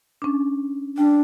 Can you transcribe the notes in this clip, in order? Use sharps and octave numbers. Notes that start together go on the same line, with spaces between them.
C#4 D4
D4 G5